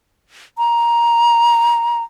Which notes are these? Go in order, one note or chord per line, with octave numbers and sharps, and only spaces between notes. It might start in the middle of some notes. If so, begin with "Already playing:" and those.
A#5